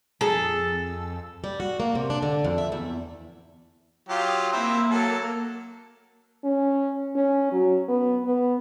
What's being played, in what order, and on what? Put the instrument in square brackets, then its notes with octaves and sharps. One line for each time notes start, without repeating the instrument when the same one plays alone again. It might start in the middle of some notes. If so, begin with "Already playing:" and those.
[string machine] F2 E6 [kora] G#4 [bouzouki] A4
[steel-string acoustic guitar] G3
F#4
A#3
C3
D4
D3
F2
E5
E2
[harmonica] F#3 F4 G4 [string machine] D#6
[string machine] A#3 [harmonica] C4 E4
[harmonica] F#3 A4
[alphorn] C#4
C#4
F#3
B3
B3